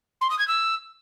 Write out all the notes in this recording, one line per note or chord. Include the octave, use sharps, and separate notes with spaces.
C6
D#6
G#6
E6